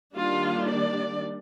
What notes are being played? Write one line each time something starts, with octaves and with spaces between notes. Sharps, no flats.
D#3 G3 A#3 D4 F4
D5